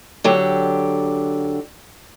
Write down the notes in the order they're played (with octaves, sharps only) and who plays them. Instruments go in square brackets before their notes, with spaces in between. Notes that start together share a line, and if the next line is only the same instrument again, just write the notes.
[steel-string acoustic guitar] D3 F#3 G4